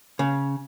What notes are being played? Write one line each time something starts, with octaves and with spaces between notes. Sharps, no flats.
C#3